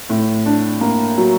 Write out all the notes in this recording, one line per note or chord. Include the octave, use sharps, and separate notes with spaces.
A2
D4
A#3
F#3